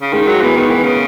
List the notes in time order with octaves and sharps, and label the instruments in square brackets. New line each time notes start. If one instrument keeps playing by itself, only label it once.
[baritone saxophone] C#3
[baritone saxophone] D#3 [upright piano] G#3
[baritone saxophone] F#3
[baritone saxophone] E3 [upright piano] B3
[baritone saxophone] D#3
E3
C#3